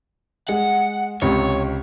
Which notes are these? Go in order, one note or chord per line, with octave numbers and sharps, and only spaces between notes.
G#3 F#5
C#2 C3 C#5